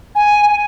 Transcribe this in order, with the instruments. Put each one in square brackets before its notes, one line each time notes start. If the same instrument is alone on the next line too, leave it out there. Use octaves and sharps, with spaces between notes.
[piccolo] G#5